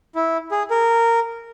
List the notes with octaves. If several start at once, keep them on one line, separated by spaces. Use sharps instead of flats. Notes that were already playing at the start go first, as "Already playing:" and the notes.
E4
G#4
A#4